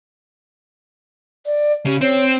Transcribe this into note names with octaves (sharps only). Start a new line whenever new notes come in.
D5
C#3 G4
C4 C#5